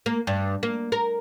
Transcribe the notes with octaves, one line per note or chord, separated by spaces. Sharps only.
A#3
G2
A#3
A#4